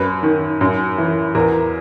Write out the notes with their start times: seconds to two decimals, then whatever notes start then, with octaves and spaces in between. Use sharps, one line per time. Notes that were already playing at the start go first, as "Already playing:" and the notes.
Already playing: F#2 B4
0.23 D#3
0.61 F#2
0.98 E3
1.35 E2 A#4